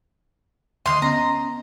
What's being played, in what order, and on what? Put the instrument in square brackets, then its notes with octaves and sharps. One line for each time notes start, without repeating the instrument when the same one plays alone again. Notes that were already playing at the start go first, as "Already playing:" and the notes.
[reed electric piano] D2 D3 [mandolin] D#5 F5 C6
[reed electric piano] B3 C#4 D#5 [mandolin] A#5